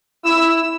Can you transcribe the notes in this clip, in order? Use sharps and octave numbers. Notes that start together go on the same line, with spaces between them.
E4 E6